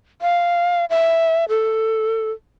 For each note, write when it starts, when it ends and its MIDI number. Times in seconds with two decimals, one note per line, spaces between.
0.22 0.85 77
0.90 1.45 76
1.49 2.31 69